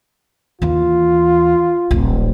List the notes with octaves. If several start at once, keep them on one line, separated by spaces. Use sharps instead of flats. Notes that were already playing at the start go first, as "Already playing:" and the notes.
D#2 E3 F4
D1 A#1